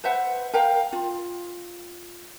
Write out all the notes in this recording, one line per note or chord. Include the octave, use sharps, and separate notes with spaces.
B4 C5 E5 F#5
A#4 F5 G5
F4